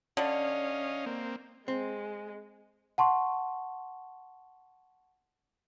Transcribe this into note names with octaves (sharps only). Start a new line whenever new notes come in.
D3 C#4 D#5 F5
A#3 C4
G#3 C4
F#5 A5 C6 C#6